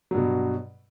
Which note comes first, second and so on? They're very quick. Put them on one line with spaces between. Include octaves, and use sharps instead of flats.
F#3 G2 B2